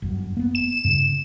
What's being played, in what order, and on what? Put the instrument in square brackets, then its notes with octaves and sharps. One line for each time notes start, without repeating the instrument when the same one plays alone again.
[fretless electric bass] G1 F#2
A#3 B3
[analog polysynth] E7
[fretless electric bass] G2 C#3